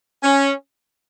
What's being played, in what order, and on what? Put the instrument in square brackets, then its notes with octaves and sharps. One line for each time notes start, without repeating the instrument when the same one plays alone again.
[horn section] C#4